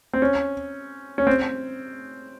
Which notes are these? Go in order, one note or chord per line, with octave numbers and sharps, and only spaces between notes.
C4
C#4
C#4
C4